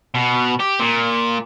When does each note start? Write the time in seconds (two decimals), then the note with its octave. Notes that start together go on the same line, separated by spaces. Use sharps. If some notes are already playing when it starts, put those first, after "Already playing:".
0.15 B2
0.60 G4
0.79 A#2